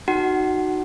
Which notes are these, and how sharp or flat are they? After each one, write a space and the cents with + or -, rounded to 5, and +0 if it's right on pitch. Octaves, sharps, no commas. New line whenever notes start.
D#4 -15 F#4 +0 F#5 +25